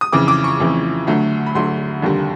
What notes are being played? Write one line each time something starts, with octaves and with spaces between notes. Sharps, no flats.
D#6
F2 C#3 E3 D6
D6
C#6
F2 C#3 E3
D2 D3 F#3 A3
B5
D2 D3 F#3 A3 C6
F1 D#2 D3 G3